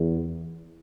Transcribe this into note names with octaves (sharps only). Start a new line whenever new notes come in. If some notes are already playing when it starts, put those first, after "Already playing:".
Already playing: E2